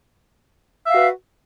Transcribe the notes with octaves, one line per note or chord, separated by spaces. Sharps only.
F#4 B4 E5 F5